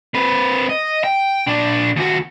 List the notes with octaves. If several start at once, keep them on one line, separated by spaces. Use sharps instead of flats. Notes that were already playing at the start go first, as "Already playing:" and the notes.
C4 B4
D#5
G5
A#2 D4
D#2 F#4